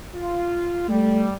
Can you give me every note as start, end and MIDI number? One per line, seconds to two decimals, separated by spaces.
0.15 0.87 65
0.88 1.33 55
0.88 1.27 57